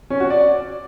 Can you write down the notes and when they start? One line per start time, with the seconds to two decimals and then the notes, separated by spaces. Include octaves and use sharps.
0.10 C#4
0.20 F#4
0.30 D5